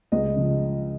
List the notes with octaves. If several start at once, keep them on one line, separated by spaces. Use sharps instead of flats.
C#2 D#5
C#3 F3